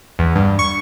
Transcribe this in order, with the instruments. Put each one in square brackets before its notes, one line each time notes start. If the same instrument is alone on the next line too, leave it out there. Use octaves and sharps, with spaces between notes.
[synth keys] E2
G2
C#6